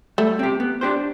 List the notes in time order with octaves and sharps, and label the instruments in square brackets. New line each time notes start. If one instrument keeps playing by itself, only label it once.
[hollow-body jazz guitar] G3 [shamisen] A3
[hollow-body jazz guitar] C4 G4
B3
D4 G4 C5